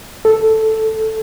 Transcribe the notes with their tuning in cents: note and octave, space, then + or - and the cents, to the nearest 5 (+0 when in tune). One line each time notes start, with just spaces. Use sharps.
A4 +0